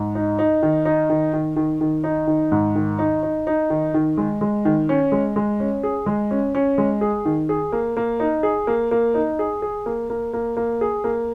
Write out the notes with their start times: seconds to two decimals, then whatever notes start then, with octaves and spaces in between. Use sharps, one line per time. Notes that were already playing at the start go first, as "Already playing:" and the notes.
Already playing: G#2
0.15 D#4
0.39 D#4
0.63 D#3
0.85 D#4
1.10 D#3
1.33 D#3
1.56 D#3
1.81 D#3
2.04 D#4
2.27 D#3
2.52 G#2
2.75 D#3
2.99 D#4
3.23 D#4
3.47 D#4
3.70 D#3
3.94 D#3
4.17 G#3
4.41 G#3
4.65 D#3
4.89 C#4
5.12 G#3
5.36 G#3
5.60 C#4
5.83 G#4
6.06 G#3
6.31 C#4
6.55 C#4
6.78 G#3
7.01 G#4
7.25 D#3
7.49 G#4
7.72 A#3
7.97 A#3
8.20 D#4
8.43 G#4
8.67 A#3
8.91 A#3
9.14 D#4
9.39 G#4
9.62 G#4
9.86 A#3
10.10 A#3
10.33 A#3
10.57 A#3
10.81 G#4
11.04 A#3